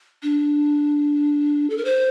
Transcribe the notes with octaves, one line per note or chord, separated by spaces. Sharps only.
D4
A4
A#4
C5